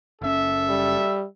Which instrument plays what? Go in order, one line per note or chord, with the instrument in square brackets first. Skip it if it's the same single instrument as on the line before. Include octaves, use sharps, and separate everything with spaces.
[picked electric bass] F#1 C#4 [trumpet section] A4 E5
[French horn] G3